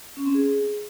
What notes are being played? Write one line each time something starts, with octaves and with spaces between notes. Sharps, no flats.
C#4
C4
G#4